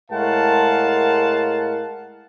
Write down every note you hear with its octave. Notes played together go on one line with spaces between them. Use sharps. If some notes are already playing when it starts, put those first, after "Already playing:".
A2 G#3 A#4 F5 F#5 A5